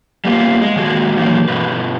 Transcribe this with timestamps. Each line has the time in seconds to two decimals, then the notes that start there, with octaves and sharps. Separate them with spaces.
0.25 G3 A#3 B3 F4
0.61 G#3
0.76 A#2 D#3 G#3 F#4 G#4
1.17 A#2 D#3 E3 F#3 A#3
1.48 G2 B2 B4